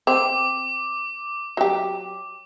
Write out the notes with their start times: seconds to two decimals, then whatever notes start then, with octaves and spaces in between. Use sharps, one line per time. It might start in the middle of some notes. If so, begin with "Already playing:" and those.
0.07 C4 D6
1.57 F#3 G4